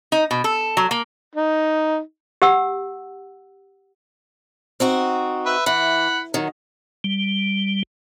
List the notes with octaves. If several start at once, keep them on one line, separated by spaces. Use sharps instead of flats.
D#4
B2
A4
F#3
A#3
D#4
G4 F#5 E6
C4 D#4 F#4
B4 E5
E3 F#5 B5
D#3 F#3
G3